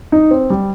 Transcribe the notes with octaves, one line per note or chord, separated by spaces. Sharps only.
D#4
C4
G3